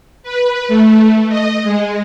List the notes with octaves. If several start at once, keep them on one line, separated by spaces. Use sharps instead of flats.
B4
A3
D#5
G#3